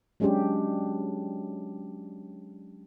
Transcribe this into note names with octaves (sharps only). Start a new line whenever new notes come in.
F#3 G#3 C#4 D4 G4